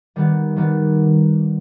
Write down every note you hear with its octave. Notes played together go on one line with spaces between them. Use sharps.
D#3 G3 B3
D#3 G3 B3